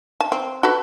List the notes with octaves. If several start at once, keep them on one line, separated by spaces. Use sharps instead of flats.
A5
C4
F#4 A4 B4